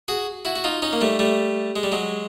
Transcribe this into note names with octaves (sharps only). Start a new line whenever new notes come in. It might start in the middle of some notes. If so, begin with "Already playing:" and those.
F#4 G#4
E4 F#4
F#4
D#4 F4
C#4 D#4
A#3
G3 A3
G3 A3
G#3
G3
F#3 G#3